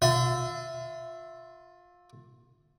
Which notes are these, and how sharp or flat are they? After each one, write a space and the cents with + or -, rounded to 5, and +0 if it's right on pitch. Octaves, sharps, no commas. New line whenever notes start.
F4 +25 E5 +0 C6 -35